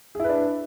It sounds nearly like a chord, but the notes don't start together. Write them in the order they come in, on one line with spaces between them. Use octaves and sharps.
G#4 E4 B4 D4